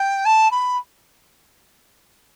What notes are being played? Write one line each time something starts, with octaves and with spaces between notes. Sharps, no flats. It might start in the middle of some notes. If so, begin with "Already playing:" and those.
Already playing: G5
A5
B5